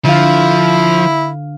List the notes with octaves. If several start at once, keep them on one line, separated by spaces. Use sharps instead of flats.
D3 F3 E4 F5